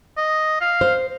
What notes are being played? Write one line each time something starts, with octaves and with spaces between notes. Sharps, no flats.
D#5
F5
C5